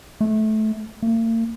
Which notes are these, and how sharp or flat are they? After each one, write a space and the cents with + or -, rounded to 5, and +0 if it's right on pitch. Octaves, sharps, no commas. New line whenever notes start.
A3 -20
A#3 -45